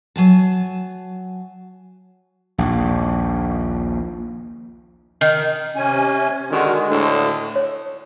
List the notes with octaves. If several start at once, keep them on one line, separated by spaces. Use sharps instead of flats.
F#3 G#5 A5
A#1 D#2
D#3
C3 C#4 G#5
D3 D#3 G#3 F#4
D2 A2 D3
C#5